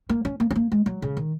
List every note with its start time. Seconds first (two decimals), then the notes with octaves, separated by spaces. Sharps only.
0.09 A#3
0.25 C#4
0.40 A#3
0.51 C#4
0.56 A#3
0.72 G#3
0.86 F#3
1.02 C#3
1.17 D#3